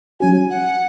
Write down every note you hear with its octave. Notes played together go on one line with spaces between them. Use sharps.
F#3 C#4 F#4 G#5
F#5